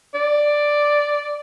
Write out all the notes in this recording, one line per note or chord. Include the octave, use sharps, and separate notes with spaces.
D5